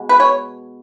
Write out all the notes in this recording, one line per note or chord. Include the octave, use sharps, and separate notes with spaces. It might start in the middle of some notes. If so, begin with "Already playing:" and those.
Already playing: B2 G#3 B3
B4
C#5